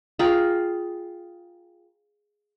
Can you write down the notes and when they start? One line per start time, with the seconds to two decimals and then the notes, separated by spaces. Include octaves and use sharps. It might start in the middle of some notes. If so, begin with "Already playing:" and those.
0.19 F4 G#4 A#4 G5